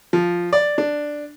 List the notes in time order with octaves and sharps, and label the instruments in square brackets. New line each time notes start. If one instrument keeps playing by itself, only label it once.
[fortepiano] F3
D5
D4